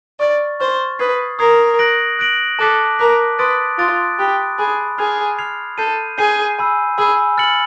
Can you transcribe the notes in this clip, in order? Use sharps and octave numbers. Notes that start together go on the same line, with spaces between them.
D5 C#6 F6 A6
C5 C#6 F6 A6
B4 D#6 G#6 C7
A#4 D#6 G#6 C7
F#6 A#6 D7 F#7
F#6 A#6 D7 F#7
A4 A5 D6 F#6 B6
A#4 A5 D6 F#6 B6
B4 C6 D#6 F#6 A6 D7
F4 C6 D#6 F#6 A6 D7
G4 B5 D#6 F#6
G#4 B5 D#6 F#6
G#4 F6 G#6 C7 F7
F6 G#6 C7 F7
A4 G6 C7 D#7
G#4 G6 C7 D#7
G#5 B5 E6
G#4 G#5 B5 E6
F6 A6 C#7 F#7